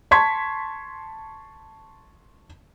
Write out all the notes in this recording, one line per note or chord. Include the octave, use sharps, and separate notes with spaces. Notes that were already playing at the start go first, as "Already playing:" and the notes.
A5 C6 C#6 G#6 B6